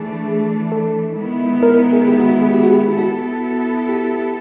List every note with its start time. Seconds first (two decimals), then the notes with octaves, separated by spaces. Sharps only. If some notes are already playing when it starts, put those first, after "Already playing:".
Already playing: E3 A3 D4 G#4
0.72 A4
1.17 D#3 G#3 B3 E4
1.63 A#4
1.93 G#4
2.08 G4
2.19 F#4
2.30 F#4
2.42 G#4
2.53 G4
2.63 F#4
2.73 G4
2.98 B3 E4 F#4 A4
3.89 G4